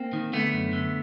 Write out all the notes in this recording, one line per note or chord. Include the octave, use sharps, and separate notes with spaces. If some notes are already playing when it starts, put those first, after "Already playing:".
Already playing: A#3 C4
D#3
D3 A3 B3
F#2
D3